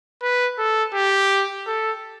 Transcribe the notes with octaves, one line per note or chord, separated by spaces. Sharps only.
B4
A4
G4
A4